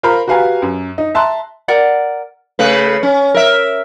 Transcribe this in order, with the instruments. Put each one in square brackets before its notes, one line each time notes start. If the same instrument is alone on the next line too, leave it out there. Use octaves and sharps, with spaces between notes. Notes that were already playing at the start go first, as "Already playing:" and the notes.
[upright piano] F4 A#4 C5 F5 A#5 B5
F#4 G4 B4 F5 G#5 A#5
F#2
D#4
E5 A5 A#5 C6 F#6
[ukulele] A#4 D5 F#5
[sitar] C#3 A3 B4
C#4
A#4 E5